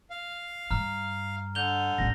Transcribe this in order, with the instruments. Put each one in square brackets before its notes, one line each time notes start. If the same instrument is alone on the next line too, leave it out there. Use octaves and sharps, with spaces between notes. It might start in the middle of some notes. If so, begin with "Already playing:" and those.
[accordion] F5
[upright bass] G2 [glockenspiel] A#5 F6
[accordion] D3 [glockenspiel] G6 F7 G7
[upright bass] A1 E2 [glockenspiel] A#6